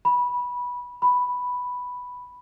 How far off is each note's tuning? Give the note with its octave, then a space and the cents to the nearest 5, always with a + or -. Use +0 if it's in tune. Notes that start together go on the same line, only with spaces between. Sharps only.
B5 -15
B5 +0